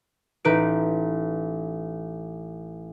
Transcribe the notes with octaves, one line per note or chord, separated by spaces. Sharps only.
A1 D#4 B4 D7